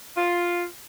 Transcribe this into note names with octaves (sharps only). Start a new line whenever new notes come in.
F4